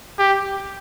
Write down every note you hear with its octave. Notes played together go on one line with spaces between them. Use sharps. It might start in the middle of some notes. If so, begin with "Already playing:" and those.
G4